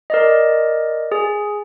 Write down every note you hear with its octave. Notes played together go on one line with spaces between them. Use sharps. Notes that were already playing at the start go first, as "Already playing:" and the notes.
A#4 D5 D#5
G#4